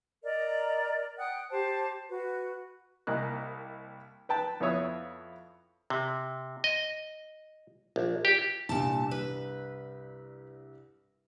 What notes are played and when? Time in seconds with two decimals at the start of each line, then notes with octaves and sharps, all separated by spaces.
0.25 A#4 D5 D#5 A#5
1.18 F#5 G5 D#6 F#6
1.51 G4 C5 A5
2.09 F#4 B4
3.07 C2 A#3 D#5 F#6
4.29 B4 G5 A5
4.60 F2 B3 E4 C#5 D#6 E6
5.90 C3
6.64 D#5
7.96 A#1
8.25 G4
8.69 C2 G2 A#2 A5
9.11 B4